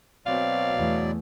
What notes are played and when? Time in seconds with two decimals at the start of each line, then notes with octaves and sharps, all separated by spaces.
0.26 B2 F#3 C4 D5 F5
0.77 E2 A3